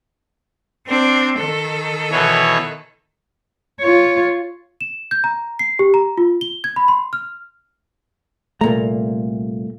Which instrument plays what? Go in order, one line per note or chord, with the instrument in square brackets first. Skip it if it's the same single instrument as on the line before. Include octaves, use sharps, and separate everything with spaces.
[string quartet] C4 D4
D#3 A4
[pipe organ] B2 E3 C#5
[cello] F4 C#5
[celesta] E7
G6
A#5
C7
G4
A#5
F4
G7
G#6
B5
C6
F6
[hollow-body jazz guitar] C2 A#2 A#5 [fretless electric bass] A3 A#3